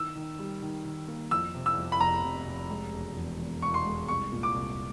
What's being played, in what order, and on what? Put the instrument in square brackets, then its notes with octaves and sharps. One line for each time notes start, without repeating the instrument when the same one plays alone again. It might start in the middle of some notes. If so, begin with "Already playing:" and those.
Already playing: [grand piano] D#3 [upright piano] E6
[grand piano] D#3
G3
D#3
D#3
A#3
[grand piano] F2 [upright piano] E6
[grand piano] C3
[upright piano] E6
[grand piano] F2
[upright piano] B5
[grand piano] F1 [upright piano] A#5
[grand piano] F1
F1
G#3
E1
E2
E2
[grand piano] E1 [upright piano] C#6
[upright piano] C6
[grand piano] G#3
[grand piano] C2 [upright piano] C#6
[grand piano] A#2
[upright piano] D6
[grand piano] C2